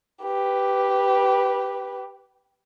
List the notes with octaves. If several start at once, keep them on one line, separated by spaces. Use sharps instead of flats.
G4 B4